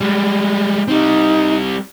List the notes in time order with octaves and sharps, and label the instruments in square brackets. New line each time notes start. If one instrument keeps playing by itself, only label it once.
[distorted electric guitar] G3 G#3
[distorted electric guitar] G3 C4 [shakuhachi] D#4